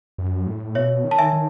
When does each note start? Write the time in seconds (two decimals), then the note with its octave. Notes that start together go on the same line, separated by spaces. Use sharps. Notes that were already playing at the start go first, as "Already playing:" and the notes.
0.18 F#2
0.47 A2
0.75 B2 C#5 E5
1.04 D#3
1.11 A5
1.19 E5 G#5
1.33 D#3